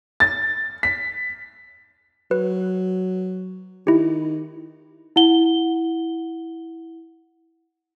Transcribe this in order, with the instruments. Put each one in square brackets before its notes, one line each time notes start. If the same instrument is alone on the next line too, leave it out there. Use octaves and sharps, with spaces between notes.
[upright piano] A6
B6
[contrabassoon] F#3 [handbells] B4
[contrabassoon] D#3 [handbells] E4 G4
[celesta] E4 F#5 G7